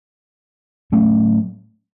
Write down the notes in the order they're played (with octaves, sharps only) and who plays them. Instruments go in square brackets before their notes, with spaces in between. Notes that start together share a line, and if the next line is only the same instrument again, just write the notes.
[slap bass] A2 F#3 A3 C#4